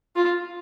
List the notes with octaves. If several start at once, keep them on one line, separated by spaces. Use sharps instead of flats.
F4